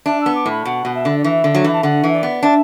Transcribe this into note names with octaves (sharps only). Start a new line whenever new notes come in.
D4 E5
B3 E6
D6
A2 B5
B2 F#5
B2
E5
D3
D5
E3 E5
D3
F#3
E3
A5
D3 F#5
E3
D5
B3
D4 E5